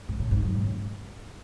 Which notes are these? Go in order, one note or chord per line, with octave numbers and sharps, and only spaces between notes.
G#2
A2
G#2
F#2
G#2
C#3